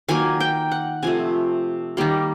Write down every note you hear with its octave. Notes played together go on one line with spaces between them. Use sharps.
D#3 F#3 A#3 G#5
G5
F#5
C3 F3 A3 G#5
D#3 G3 A#3